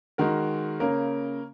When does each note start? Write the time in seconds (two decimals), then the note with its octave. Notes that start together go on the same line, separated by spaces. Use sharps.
0.18 D#3 G#3 F#4 A#4
0.80 C#3 A#3 C#4 A#4